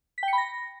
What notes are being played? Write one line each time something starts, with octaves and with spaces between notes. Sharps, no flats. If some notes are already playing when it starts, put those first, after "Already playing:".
B6
G5
C#7
B5
A#6